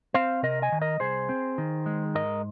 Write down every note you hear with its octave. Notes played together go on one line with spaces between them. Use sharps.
C4 C5 F5
C3 A#4 D#5
D#5 G#5
D#3
A#4 D#5
C2 G#4 C5
C4
D#3
G#3
G#2 A#4 D#5